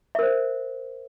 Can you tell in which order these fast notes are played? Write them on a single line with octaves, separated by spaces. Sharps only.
E5 A#4 C5